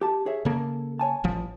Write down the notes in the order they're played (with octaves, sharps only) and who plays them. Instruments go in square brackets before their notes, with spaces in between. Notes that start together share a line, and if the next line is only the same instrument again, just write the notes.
[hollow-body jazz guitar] G4 A5
G#4 C#5 E5
[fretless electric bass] C#3 A#3 [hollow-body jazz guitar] A4
[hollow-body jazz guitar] C#5 G#5 A5
[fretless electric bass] A1 F3